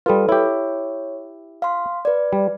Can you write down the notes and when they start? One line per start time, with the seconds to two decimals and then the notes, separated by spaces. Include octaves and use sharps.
0.06 G3 F4 A4 B4
0.29 E4 G4 C#5
1.62 F5 C6
2.05 B4 D5
2.33 G3